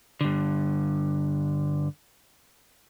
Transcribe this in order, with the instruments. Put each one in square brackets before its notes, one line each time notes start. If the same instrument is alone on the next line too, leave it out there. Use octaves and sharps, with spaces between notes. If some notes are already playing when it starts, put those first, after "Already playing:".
[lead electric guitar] G2 D3